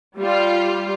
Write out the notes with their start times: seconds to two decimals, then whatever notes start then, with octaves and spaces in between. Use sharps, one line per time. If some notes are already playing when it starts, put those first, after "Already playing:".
0.18 G3 F4